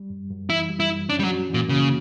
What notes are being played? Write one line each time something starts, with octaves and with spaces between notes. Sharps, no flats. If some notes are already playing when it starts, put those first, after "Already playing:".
Already playing: G3
F#2
F#2
E3 E4
G3
E4
F#2
C#4 D4
G3
F#3
F#4
A#2 E3
C#3 A#3